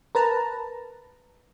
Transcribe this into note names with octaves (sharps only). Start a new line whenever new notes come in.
A#4 B4 A5 A#5